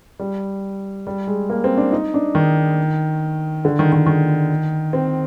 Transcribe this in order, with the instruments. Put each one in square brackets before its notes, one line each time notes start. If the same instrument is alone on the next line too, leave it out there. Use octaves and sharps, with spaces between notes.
[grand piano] G3
G3
G#3
A#3
C4
D4
D#4
D4
D#3
D3
D#3
D#3
D#3
C4